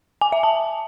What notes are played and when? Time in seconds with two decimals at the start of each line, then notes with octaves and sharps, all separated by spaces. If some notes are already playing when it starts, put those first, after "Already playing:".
0.21 G#5
0.32 E5
0.43 A5